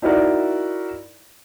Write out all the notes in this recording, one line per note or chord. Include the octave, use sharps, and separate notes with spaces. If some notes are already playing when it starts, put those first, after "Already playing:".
D#4 E4 F#4 A#4 D5